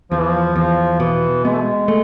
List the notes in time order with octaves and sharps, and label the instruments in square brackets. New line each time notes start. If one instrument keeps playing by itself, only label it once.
[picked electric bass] E2 [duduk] F3
[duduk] E3
F3
[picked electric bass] E2 [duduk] F3
[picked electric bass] B2 [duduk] E3
[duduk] G#3 [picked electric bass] B3
[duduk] A3
G#3
[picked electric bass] A3